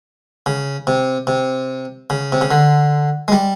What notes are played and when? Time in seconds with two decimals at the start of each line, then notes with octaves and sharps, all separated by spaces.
0.46 C#3
0.87 C3
1.27 C3
2.10 C#3
2.32 C3
2.41 C#3
2.51 D3
3.28 G#3
3.32 G3